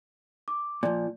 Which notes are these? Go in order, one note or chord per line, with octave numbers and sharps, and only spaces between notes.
D6
A#2 F3 D5